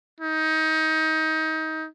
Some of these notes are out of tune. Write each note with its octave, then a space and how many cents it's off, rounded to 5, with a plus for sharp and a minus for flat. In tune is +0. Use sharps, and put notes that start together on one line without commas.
D#4 +25